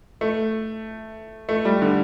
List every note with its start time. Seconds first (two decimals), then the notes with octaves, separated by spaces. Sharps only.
0.21 A3
1.49 A3
1.65 G3
1.82 D3